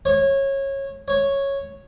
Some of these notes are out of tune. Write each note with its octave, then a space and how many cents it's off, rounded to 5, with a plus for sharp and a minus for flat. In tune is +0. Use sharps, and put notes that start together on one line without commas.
C#5 -20
C#5 -5